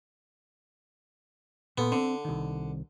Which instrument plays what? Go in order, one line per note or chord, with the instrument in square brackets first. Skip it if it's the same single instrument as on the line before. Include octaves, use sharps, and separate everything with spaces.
[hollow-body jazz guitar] A#2 A4 C6 [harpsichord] B3
[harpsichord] D3 [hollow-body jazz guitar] C4
[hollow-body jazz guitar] C2 D#3